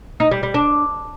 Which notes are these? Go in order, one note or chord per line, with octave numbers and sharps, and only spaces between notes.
D#4
G3
G3
D4